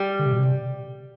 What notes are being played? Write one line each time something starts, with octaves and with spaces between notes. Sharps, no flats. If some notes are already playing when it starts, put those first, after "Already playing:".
Already playing: G3
D3
C3
B2
C3